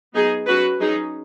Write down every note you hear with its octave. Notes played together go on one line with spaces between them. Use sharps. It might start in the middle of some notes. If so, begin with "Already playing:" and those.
F#3 B3 D#4 G#4
F#3 C#4 F#4 B4
F#3 C#4 D#4 G#4